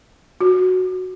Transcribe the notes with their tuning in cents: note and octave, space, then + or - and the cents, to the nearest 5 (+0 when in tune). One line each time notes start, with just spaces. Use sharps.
F#4 -5